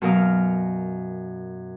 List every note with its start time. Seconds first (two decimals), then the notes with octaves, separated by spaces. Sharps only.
0.02 F#2 B2 A#4 F5 D#6 F6